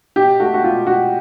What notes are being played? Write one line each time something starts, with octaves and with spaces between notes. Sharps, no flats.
B2 G4
A3 F#4
F#4
B2 F4
B2 F#4